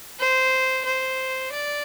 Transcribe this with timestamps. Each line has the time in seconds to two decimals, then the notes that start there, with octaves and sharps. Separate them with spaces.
0.19 C5
0.85 C5
1.52 D5